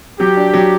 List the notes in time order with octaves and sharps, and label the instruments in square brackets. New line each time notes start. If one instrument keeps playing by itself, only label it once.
[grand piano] F#3 [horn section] G4
[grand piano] D4
F#3